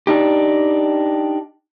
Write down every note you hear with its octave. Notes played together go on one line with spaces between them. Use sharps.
D4 D#4 G4